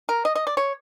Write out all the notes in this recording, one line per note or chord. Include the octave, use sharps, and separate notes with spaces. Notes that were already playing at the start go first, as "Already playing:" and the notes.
A#4
D#5
D#5
D5
C#5